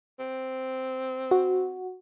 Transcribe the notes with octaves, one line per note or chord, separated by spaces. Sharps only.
C4
F#4